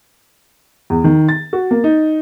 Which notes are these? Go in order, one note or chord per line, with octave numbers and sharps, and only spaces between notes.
E2
D#3
A6
F#4
A#3
D#4